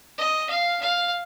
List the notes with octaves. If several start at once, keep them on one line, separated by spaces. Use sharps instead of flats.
D#5
F5
F5